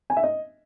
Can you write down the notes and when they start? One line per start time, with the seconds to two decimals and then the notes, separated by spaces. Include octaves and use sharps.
0.10 G#5
0.17 E5
0.23 D#5